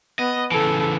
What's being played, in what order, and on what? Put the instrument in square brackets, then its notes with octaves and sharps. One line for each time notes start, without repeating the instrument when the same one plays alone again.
[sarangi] B3 [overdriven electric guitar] D#5
[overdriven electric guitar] C#3 E3 [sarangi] A4